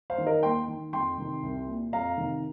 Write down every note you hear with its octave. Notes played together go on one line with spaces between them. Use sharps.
C5 F5
D#3
A#4 D#5
D#2 G5 C6
D#3
F2 G5 C6
C3 D#3
C2
A#2
F2 F5 A#5
C3 D#3